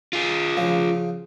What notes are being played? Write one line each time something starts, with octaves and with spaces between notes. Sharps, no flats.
F4 G#4
C#3 F3